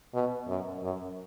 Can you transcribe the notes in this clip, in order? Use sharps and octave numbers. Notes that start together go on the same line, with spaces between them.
B2
F#2
F#2